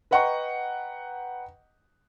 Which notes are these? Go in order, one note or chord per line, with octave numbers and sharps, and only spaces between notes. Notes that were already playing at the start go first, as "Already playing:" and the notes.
B4 D#5 F#5 G5 A#5 C#6